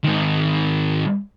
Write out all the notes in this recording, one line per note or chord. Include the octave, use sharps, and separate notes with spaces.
G#2 D#3